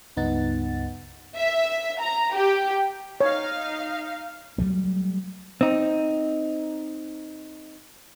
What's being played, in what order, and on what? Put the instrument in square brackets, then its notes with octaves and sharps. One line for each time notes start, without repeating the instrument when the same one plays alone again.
[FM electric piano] C#2 G2 B3 D#4 F#5 A6
[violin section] E5
A#5
G4
[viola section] D#4 F5 [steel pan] C#5
[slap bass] F#3 G3 A3
[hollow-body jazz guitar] C4 D#4